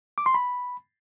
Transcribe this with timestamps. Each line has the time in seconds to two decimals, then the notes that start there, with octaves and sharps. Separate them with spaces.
0.18 D6
0.26 C6
0.34 B5